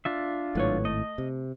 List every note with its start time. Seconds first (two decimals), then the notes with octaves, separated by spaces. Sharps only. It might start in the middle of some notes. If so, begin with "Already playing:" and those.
0.05 D4 F4 E5
0.55 G#1 A2 F#3 B4 C#5
0.85 A3 D#5
1.18 C3